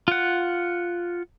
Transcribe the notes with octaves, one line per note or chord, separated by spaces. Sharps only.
F4 F#5